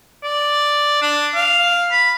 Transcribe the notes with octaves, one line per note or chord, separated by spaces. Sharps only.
D5
D4
F5
B5